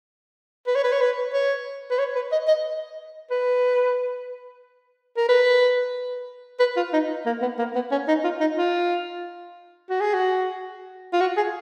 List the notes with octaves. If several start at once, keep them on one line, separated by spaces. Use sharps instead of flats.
B4
C#5
B4
C#5
B4
C#5
B4
C#5
B4
D#5
D#5
B4
A#4
B4
B4
F4
D#4
A#3
B3
A#3
B3
C#4
D#4
F4
D#4
F4
F#4
G#4
F#4
F4
F#4
G#4